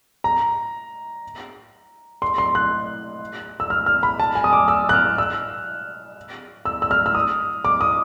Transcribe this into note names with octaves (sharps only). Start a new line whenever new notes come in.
A#5
C6
C6
F#6
E6
F6
F6
B5
A5
G#5
D#6
D6
E6
F#6
F6
E6
E6
E6
F6
E6
D#6
D6
D#6